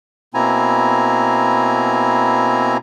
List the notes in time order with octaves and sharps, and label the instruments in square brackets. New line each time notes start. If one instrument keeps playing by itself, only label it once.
[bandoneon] B2 A#3 C4 E4 G#5 A#5